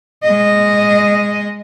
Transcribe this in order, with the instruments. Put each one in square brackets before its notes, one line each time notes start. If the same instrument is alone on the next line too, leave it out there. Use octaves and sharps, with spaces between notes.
[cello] G#3 D#5